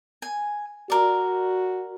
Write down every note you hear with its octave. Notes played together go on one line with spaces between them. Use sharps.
G#5
F#4 A#4 D5